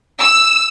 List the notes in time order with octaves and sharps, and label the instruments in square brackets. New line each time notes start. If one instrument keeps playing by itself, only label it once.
[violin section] E6